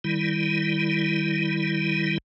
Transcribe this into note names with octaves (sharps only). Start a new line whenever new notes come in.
D#3 G3 E4